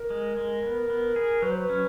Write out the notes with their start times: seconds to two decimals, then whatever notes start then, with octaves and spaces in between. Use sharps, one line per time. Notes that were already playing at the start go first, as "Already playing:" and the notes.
Already playing: A#4
0.10 G#3
0.37 G#3
0.63 B3
0.90 B3
1.16 G#4
1.42 F#3 B4
1.51 C5
1.60 B4
1.70 C#4